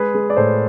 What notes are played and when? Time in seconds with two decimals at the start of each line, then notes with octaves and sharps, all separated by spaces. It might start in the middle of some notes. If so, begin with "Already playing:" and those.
Already playing: G#3 G#4 B4
0.14 G#3
0.30 D5
0.36 A2 A4 C5